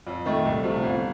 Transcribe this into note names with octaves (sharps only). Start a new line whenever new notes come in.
F2
D#3 A3
C2
C3 F3 A3
G1